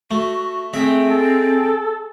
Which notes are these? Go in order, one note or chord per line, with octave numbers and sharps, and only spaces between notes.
A3 F#4
G#3 A3 C4 E5
A4